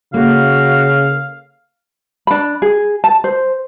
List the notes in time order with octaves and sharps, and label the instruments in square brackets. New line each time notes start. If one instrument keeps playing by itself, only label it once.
[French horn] C#3 [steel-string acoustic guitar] A#3 [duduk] F#4 [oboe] F5
[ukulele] D4 B5
G#4
A5
C5